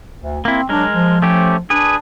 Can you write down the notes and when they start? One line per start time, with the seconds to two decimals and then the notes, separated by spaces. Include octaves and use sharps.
0.21 D2
0.45 A#3 C4 E4
0.69 F#3 G#3 D4 A#4
0.94 F3
1.22 A3 C#4 G4
1.70 D4 G#4 B4